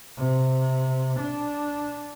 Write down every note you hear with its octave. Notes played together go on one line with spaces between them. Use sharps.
C3
D4